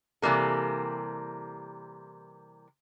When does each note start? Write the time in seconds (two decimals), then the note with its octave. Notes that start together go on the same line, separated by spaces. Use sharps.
0.22 C3 E3 G3 A#3 A4